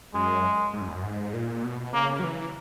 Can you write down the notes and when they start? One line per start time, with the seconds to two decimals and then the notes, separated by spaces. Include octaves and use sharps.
0.14 F#2 G#3
0.73 G#2
0.81 F#2
0.88 E2
0.95 F#2
1.03 G#2
1.34 A#2
1.64 B2
1.93 C#3 A#3
2.20 F#3
2.24 E3